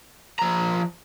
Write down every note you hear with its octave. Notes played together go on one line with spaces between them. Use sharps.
F3 A#5